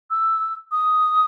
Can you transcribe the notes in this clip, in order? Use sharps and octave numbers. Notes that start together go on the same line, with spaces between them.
E6
D#6